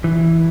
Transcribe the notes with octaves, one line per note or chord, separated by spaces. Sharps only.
E3